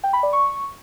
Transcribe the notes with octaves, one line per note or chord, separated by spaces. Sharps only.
G5
B5
D5
C#6